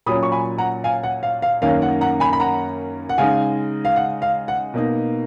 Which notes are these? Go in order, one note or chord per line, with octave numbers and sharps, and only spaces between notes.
A#2 F#3 C#4 B5 D#6
C#6
G#5 B5
F#5 A#5
F5 G#5
F#5
F5
F5
F#2 D#3 A#3 C#4 F5
F#5
F#5 A#5
G#5 B5
B5
F#5 A#5
F#5
C#3 G#3 D#4 F5 G#5
F5
F#5
F5
F#5
B2 A#3 D#4